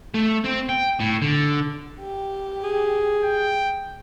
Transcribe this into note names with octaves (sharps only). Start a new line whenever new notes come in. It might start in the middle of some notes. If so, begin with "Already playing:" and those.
A3
C4
G5
A2
D3
G4
G#4
G5